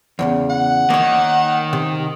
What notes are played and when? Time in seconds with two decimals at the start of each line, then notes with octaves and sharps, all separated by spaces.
0.19 E2 A2 C#3
0.50 F#5
0.90 D#3 A#3 C#5
1.73 C3